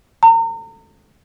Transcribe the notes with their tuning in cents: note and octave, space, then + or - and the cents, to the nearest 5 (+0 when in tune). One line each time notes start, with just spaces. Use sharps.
A#5 -35